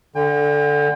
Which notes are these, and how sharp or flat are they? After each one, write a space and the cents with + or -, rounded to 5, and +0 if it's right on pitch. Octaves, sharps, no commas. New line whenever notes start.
D3 +0 G5 +35